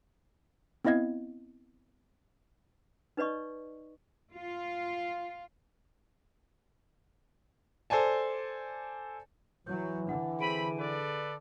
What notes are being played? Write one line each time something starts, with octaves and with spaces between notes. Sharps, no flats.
B3 C4 E4 D#5 F5 G#6
D#4 B4 D5 D#5 C#6
F4
A4 C5 D5 G#5 A5
E3 F#3 G6
D3 D4 F#5
C4 G#4 B5 D7 D#7
A4 B4 D5